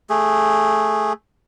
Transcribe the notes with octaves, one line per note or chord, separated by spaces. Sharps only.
A3 G#4